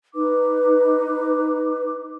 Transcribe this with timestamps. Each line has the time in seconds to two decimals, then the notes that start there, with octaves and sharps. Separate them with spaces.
0.14 D#4 B4 D6